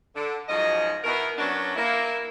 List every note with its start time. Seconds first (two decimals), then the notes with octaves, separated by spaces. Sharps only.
0.15 D3
0.48 G#2 F3 F#3 C#4 D#5
1.04 B2 B3 E4 A#4
1.38 F#3 B3 C#4 D4
1.76 A#3 E4